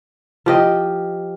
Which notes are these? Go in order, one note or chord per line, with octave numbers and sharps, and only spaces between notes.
F3 G4 D#5